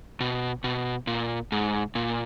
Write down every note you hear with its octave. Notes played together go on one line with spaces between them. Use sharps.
B2
B2
A#2
G#2
A#2